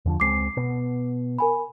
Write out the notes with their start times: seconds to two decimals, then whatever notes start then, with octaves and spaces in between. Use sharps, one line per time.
0.05 E2 D3 F3
0.20 C#2 G#3 C4 D6 C7
0.57 B2 B3
1.38 A#4 G#5 B5